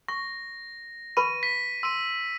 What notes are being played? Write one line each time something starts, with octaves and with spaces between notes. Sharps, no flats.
C#6 A#6
B4 B5 C#6 D#7
B6
C6 E6 D#7